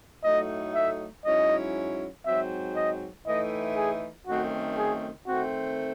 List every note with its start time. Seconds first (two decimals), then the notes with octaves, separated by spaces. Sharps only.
0.24 A2 F#3 A3 D#4 D#5
0.75 E5
1.25 G#2 F#3 C#4 E4 D#5
2.25 G#2 F#3 C4 E5
2.76 D#5
3.26 A2 E3 A3 D#4 D#5
3.76 G#4
4.27 F#2 D#3 A3 C4 F#4
4.77 G#4
5.27 D#3 A3 C4 F#4